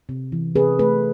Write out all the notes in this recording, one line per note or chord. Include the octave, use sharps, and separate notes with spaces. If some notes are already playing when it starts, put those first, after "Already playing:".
C3
E3
C3 G#4 B4
A3 G#4 B4